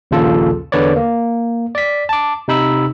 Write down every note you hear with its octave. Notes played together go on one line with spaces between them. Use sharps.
A#1 D#2 A#2 C#3 F4 A4
E2 D3 B4 C#5 D5
A#3
D5 B6
A5 D6
C3 D#4 B5 E6